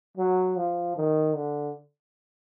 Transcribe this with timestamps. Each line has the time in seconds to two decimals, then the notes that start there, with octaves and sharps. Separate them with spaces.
0.18 F#3
0.56 F3
0.96 D#3
1.35 D3